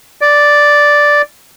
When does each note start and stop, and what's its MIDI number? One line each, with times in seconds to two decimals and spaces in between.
0.21 1.22 74